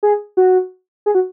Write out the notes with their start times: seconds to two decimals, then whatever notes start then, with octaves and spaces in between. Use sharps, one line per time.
0.03 G#4
0.37 F#4
1.06 G#4
1.15 F#4